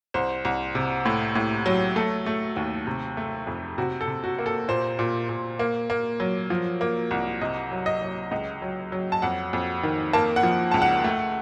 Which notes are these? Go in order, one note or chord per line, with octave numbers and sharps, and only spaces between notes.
C2 C5
C2
C3
A2
A2
F#3
A3 A4
A3
D#2
C3
A3
F2
C3 F#4
A4
C3
F#4
A#3
A4
A#2 C5
A#2
A#2
A#3
A#3
F#3
F3
A#3
C2
C3 D#5
F#3
D#5
F#3
C#2 D#5
F#3
F#3
A5
F2 F#5
F2
D#3
A#3 A5
F#5
F3
C#2 A5
F#5
A3